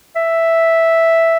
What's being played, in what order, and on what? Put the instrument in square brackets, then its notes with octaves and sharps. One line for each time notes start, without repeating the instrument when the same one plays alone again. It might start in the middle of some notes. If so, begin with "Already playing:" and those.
[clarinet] E5